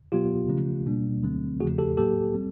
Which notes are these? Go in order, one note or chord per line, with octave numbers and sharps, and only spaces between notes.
B2 F#3 B3 F4 G4
C#3 F3 A3 C#4
B2 G3 A#3 D4
D2 D3 F#3 A3 C4
E2 C#3 F3 A3 F#4 G#4
G4 A4
A2 F#3 A#3 G4 A4
G3 C4